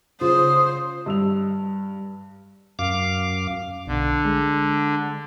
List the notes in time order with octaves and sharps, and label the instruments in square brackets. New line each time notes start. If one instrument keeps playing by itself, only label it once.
[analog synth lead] C#3 [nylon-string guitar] F4 [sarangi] C5 [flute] D#6
[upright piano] G2 E6 F7
[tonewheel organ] F#2 F5 D6
[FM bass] B1 [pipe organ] D3
[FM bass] G#3